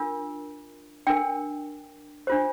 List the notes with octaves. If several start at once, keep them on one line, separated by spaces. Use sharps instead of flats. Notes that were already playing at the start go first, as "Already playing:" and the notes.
Already playing: D4 F4 A#4
D4 A#4 G5
D4 F4 C5